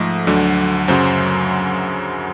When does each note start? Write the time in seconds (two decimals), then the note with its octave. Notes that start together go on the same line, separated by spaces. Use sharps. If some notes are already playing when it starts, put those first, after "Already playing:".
Already playing: G#2 F3 A3 D#5
0.27 D2 D3 F#3
0.88 F#2 C#3 F#3 C5